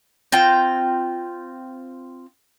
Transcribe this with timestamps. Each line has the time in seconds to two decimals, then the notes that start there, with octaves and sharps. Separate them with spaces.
0.32 C4 F4 G5